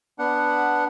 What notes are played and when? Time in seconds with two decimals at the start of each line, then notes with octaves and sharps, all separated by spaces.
0.19 B3 D4 F#5